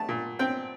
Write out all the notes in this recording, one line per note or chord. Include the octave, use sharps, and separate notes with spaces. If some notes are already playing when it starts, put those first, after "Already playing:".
Already playing: A3 A5
A#2
C4 G5